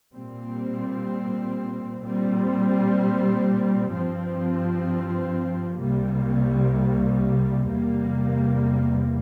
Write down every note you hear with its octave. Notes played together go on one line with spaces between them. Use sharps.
A#2 G3 C4
A#2 G3 C4
G2 F3 C4
C2 C3 G3 A#3
E2 C3 G3 A#3